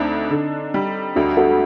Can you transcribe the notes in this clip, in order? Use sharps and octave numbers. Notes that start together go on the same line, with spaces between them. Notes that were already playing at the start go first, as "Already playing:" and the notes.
Already playing: D2 C4 D4 D#4
D3
G3
D2 D4 F#4
F#4 A4